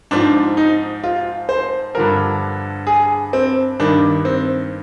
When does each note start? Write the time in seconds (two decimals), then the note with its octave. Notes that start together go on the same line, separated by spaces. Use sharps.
0.11 G#2 F3 D4
0.57 D#4
1.04 F4
1.49 C5
1.95 G2 D3 F3 A#4
2.87 G#4
3.33 C4
3.80 G2 D#3 D4
4.25 C4